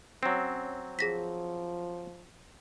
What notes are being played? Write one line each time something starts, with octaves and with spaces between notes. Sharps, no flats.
F#3 C4 C#4
F3 G#4 A#6 B6